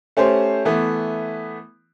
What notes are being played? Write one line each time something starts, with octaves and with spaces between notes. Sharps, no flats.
A3 C#4 G4 C5
E3 A3 B3